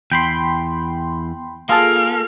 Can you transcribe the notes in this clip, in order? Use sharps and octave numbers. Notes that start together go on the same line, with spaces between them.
E2 G5 B5 C6
A#3 F4 G#4 A4 F6